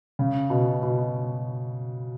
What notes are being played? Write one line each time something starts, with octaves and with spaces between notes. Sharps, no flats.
C#3
B2
B2